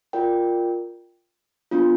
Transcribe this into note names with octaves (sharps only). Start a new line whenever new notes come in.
F4 A#4 D5 G5
B3 D4 F4